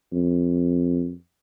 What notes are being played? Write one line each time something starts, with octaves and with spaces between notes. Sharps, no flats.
F2